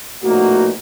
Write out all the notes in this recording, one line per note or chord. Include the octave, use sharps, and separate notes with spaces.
A#1 A2 A#3 B3 D#4 F#4